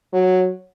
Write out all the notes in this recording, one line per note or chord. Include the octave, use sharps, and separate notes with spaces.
F#3